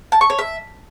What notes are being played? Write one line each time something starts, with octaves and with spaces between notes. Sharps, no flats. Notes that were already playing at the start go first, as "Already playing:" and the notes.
A5
C#6
C#5
E5